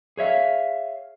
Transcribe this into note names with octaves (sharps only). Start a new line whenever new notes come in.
G#4 C#5 E5 F5